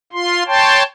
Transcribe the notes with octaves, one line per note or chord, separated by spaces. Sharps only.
F4 C6
C#5 G5 A5 C6